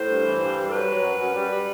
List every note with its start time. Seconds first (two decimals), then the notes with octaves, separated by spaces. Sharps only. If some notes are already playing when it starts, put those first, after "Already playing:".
Already playing: A2 C5
0.09 G2
0.25 E3
0.40 G2
0.57 G3
0.68 A4
0.72 F#3 B4
0.89 F#3
1.04 F#2
1.19 F#2
1.35 G3
1.51 G3